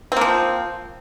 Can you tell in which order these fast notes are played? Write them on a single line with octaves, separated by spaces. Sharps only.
C4 A#3 F3